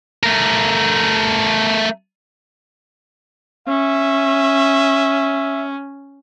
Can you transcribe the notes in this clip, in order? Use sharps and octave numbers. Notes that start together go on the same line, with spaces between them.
A3 A#4
C#4 E5